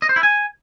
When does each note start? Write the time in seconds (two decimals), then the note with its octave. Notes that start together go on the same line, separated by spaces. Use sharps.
0.02 D#5
0.09 C5
0.16 E4
0.23 G#5